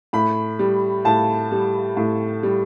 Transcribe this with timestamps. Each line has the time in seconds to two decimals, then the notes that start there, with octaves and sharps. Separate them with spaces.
0.13 A2 B5
0.59 G3
1.05 A2 A5
1.52 G3
1.97 A2
2.43 G3